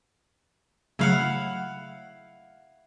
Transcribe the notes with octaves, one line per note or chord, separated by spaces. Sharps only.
C#3 F#3 A3 E4 F5 F#5